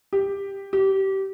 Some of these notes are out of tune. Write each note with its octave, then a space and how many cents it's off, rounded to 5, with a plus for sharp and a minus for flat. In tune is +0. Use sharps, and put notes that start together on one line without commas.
G4 +5
G4 -25